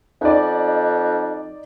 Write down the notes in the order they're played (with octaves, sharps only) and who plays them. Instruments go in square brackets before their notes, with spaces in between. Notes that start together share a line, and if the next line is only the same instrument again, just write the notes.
[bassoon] F2 [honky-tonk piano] D#4 D5